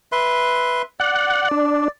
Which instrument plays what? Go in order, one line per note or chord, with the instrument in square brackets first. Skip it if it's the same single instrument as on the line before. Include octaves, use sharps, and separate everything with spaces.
[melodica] B4 E5 C6
[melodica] D5 [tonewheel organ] F#5
[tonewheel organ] D4